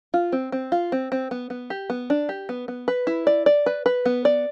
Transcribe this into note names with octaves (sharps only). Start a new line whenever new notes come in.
F4
C4
C4
F4
C4
C4
B3
B3
G4
B3
D4
G4
B3
B3
B4
E4
D5
D5
B4
B4
B3
D5